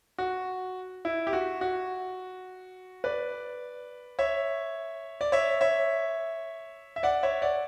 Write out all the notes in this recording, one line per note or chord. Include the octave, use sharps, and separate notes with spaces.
F#4
E4
G4
F#4
F#4
B4 D5
C#5 E5
D5
C#5 E5
C#5 E5
E5
D5 F#5
C#5 E5
D5 F#5